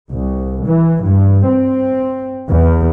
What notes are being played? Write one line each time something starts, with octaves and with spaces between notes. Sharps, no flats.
C2
E3
G2
C4
E2